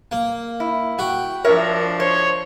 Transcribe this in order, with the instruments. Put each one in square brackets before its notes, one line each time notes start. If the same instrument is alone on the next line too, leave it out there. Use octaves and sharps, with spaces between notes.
[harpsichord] A#3
[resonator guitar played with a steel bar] E4
[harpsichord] F#4 [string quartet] G5
[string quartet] F3 D4 [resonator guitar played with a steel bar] A#4 C#5 E5
[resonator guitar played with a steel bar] C5 [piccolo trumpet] C#5